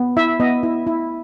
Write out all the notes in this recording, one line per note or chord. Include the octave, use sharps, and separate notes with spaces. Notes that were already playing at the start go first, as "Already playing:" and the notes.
Already playing: B3
E4 E5
B3 D#5
E4
E4